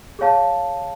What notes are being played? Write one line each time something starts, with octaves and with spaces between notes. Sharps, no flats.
G#4 C#5 F5 A5